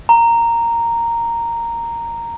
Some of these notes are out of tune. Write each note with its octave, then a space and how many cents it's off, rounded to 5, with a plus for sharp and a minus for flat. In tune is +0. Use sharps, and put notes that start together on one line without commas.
A#5 -5